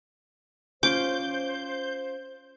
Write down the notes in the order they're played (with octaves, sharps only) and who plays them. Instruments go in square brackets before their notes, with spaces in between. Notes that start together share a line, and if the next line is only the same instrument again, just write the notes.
[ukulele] C#4 F4 [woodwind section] C5 [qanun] D6 [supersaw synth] G6